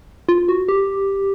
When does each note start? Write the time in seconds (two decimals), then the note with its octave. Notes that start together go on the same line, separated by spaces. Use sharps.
0.29 F4
0.48 F#4
0.68 G4